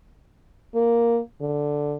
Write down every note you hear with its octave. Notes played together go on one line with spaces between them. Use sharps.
A#3
D3